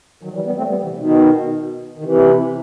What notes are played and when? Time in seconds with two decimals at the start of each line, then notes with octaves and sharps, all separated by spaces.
0.23 D#3 F#3
0.35 E3 G3
0.46 G3 B3
0.57 A3 C4
0.69 G3 B3
0.83 C3 E3
0.98 B2 D#3
1.98 D#3
2.03 C3 E3